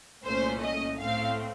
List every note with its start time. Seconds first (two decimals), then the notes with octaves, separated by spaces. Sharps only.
0.24 C2 A#2 A3 C#4 C5
0.61 D#5
0.99 A2 A3 C4 F5